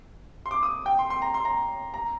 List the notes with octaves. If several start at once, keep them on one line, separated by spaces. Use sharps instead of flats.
C6
D6
D#6
G5
C6
C6
A#5
C6
A#5
A#5